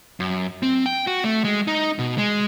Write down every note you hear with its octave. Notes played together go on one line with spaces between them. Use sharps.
F#2
C4
G5
F#4
A3
G#3
D#4
B2
G#3